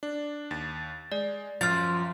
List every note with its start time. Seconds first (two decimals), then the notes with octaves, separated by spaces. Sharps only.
0.03 D4
0.51 D#2 A6
1.12 G#3 D5
1.61 F#2 F3 F6 A6